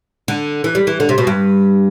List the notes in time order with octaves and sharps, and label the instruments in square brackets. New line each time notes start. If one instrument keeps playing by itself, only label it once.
[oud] D3
E3
G3
E3
D3
C3
B2
G2